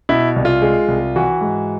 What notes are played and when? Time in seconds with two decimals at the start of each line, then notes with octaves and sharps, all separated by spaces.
0.09 B2 E4
0.36 C2
0.45 F4
0.62 G#3
0.88 C2
1.16 E3 F#4
1.41 G#2